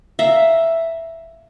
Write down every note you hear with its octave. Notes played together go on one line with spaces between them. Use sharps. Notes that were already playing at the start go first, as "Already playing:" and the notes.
E5 F5 A#5